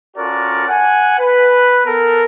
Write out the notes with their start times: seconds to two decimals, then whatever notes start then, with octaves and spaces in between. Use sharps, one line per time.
0.17 C#4 F4 F#4 A4 A#4 D5
0.68 F#5 G#5
1.19 B4
1.85 B3 A4 A#4